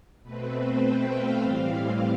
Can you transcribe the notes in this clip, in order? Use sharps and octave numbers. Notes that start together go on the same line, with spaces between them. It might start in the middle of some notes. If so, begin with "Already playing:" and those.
B2 A3 C4 B4
C5
G5
F5
A2 E3 G3 C4 F5